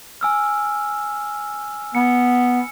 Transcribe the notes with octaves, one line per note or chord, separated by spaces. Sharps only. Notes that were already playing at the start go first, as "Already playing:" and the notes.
G#5 E6 F6
B3 C#7